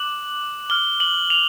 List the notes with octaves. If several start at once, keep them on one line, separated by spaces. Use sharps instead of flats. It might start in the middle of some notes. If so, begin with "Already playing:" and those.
Already playing: D6 F#6 F#7
D6 F6 G7
F#7
F7